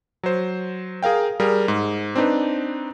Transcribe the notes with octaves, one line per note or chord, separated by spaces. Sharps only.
F#3 C5
G#4 A#4 F5 G5
G3 G#4 A#4
G#2
C4 D4 D#4 B4